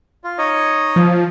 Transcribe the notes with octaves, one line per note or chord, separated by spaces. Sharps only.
F4
D#4 C#5 D#5
F3